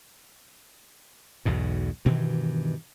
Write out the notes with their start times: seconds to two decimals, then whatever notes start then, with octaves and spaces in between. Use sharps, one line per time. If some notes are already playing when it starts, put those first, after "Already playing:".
1.45 B1 E2 G#2 B2
2.05 G2 B2 D#3 E3